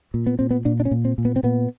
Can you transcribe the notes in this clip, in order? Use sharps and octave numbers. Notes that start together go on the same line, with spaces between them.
A#2
B3
A#2 C4
B3
A#2 D4
D4
C#4
A#2
C4
A#2
B3
C4
A#2 B3